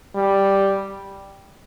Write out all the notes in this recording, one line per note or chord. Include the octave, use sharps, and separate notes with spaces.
G3